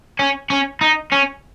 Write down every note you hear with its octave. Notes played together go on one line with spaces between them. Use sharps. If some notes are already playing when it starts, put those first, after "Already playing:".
C#4
C#4
D#4
C#4